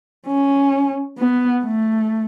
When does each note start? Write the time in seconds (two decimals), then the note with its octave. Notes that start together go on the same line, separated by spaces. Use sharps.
0.27 C#4
1.18 B3
1.65 A3